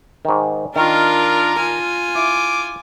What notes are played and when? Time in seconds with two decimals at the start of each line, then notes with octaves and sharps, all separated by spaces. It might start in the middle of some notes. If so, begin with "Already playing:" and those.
0.25 G#2 D#3
0.76 D#3 D4 F4 A#4
1.59 F4 G#5
2.15 E4 D6